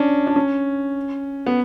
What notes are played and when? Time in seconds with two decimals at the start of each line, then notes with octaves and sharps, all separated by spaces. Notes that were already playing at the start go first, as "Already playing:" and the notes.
Already playing: C#4 D4
0.27 D4
0.36 C#4
1.46 B3